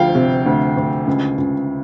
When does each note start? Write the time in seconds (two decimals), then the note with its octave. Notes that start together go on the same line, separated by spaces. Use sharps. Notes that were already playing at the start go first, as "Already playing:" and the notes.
Already playing: D2 F3 F5 G5
0.15 C3
0.46 D2
0.77 D2
1.07 C#2
1.38 C#2